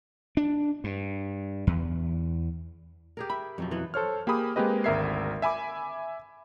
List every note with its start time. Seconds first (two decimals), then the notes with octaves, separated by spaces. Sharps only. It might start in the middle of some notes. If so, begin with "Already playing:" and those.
0.37 D4
0.84 G2
1.67 E2
3.17 G4 G#4 A#4
3.30 E5 B5
3.58 F2 B2 F3 F#3
3.71 B2 E3 B3
3.94 A4 C5 C#5 F6
4.27 A#3 G4 G#4 B5 D#6
4.56 G#3 A#3 C4 G4 B4 D#5
4.84 G#1 D2 A#4 E5 G#6 C7
5.42 E5 G#5 B5 D6